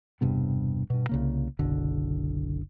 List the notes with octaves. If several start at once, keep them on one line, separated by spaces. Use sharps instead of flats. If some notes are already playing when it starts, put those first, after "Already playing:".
E1 G2 C3 B3
G2 B2
C2 C#3 A#3
F#1 B1 D3